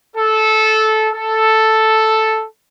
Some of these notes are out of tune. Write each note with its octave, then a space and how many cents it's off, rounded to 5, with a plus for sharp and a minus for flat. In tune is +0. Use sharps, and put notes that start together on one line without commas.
A4 -15
A4 +0